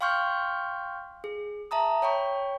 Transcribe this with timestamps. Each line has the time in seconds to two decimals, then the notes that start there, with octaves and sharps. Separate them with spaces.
0.01 F5 G5 C6 C#6 F6 G6
1.24 G#4
1.71 E5 A5 A#5 D#6
2.02 C#5 G5 B5 C#6